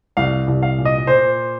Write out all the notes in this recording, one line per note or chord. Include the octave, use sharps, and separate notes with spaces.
C2 F5
C2
F5
A#2
D#5
A#2 C5